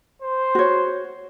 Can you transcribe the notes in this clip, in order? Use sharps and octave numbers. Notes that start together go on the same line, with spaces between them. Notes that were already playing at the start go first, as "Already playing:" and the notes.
C5
F#4 C#5